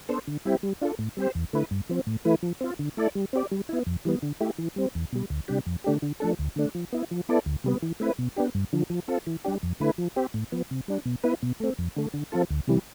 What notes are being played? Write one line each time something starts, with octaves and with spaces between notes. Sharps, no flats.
B3 D4 A4 C5
D3
G3 C4 E4 G4
G3
D4 F4 A4
A2
G3 C4 G4 C5
E2
D3 A3 E4 B4
G2
F3 C4
A2
E3 A3 E4 B4
F3
C4 F4
D3
A3 E4 A4 D5
G3
C4 G4 D5
G3
B3 E4
F2
E3 G3 B3
D3
A3 E4 G4
E3
G3 C4
E2
B2 G3
D2
C3 G3 D4 G4
F2
D3 A3 D4 G4
D3
F3 A3 D4 A4
D2
D3 A3 D4
F3
B3 E4
F3
B3 E4 A4 D5
D2
C3 G3 B3
E3
A3 C4 E4 B4
B2
B3 D4 G4
G2
D3 F3
F3
C4 F4 A4
E3
G3 D4 G4
F2
D3 A3 E4 B4
F3
C4 G4
A2
F3 B3
C3
G3 D4
B2
B3 E4 B4
B2
A3 C4
F2
D3 A3
D3
F3 C4 F4 A4
D2
C3 E3 G3